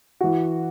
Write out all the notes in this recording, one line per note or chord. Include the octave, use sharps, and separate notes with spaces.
E3 F#4